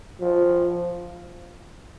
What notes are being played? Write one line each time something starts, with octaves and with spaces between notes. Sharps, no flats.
F3